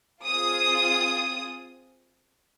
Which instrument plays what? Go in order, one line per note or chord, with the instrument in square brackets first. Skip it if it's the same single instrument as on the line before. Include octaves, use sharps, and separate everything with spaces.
[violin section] C4 F4 G#4 D#6